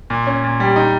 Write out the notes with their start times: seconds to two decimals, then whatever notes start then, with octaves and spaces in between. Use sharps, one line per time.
0.10 A#2
0.27 C#4
0.44 A#2
0.60 G3
0.76 D#4